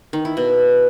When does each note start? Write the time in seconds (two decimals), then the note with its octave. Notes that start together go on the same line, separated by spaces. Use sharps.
0.13 D#3
0.25 E4
0.37 B2